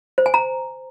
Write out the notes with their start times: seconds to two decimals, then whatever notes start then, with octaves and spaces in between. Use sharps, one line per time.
0.18 C5
0.26 G#5
0.34 A#5